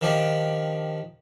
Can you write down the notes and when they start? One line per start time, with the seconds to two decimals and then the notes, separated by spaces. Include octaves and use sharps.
0.01 D#3 F3 D4 G4